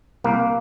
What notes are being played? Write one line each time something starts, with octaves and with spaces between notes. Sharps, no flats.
C2 A#3